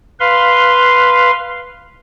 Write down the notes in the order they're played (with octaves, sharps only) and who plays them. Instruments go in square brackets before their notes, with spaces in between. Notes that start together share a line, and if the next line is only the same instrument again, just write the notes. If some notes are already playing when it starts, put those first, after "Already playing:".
[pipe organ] B4 F5 C6